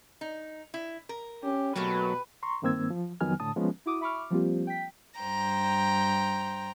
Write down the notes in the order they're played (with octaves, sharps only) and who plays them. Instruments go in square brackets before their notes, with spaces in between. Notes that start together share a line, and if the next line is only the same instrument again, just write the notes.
[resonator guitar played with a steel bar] D#4
E4
A#4
[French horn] C#4 [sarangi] G4
[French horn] B2 [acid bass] F#3 [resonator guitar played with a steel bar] A3 A#3 F#4 [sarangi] B4
[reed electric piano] A#5 C6 C#6
G2 D#3 A#3 C4 E6 G#6
F3
F2 D#3 F#3 B3 G#5 F6
A2 D3 A5 D#6
F3 G#3 B3 C#4
[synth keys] E4 F#4 D6 D#6
E5 B5 C#6 D6 F6
F3 G3 A#3 C4 F4 G4
G5 B6
[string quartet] G2 C5 G5 A#5